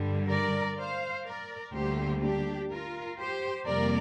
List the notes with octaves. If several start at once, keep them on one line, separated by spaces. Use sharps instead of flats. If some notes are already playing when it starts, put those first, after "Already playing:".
Already playing: G2 D3 G3
A#4 D5
C5 F5
A#4 D5
D2 D3 G3 A#3 G4 C5
D4 G4
F4 A#4
G4 C5
F2 C3 G3 A#3 A#4 D5